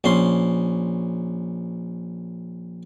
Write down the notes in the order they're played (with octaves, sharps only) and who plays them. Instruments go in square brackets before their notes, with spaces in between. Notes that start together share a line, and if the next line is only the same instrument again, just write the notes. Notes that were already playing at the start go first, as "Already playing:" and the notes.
[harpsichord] A#1 C#4 C6